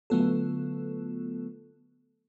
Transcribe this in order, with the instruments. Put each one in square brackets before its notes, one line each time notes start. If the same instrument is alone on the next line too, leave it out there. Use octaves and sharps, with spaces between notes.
[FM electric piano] D3 F#3 A3 B3 F4 A4